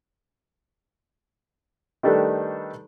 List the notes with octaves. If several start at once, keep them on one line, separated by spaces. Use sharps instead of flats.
D#3 G3 A3 D4 A4 B4